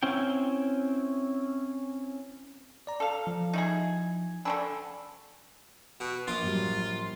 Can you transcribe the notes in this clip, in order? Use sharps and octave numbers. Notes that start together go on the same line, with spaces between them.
C4 C#4 E4 G5
D5 A#5
A4 F5
F3
D#4 E4 G#4
D3 C#4 D4 G#5 B5 E6
B2 F#4
A#1 F4 D6 D#6
A2 F#3 G3